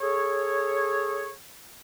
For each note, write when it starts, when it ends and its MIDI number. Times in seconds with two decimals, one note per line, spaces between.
0.01 1.31 68
0.01 1.31 69
0.01 1.31 73